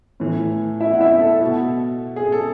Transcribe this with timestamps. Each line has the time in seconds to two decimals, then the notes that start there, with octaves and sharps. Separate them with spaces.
0.20 A2 E3
0.80 E4 E5
0.94 F#5
1.01 E4 E5
1.21 A4
1.41 B2
2.16 G#4
2.32 A4